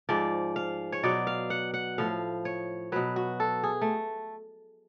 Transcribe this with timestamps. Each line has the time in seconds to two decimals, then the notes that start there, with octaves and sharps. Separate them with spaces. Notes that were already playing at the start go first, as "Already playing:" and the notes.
0.09 G#2 F3 D5
0.56 F5
0.92 C#5
1.03 B2 F#3 D5
1.27 F5
1.50 F#5
1.74 F#5
1.98 A2 F3 F5
2.45 C#5
2.92 B2 F#3 B4
3.16 F#4
3.40 A4
3.64 G#4
3.81 A3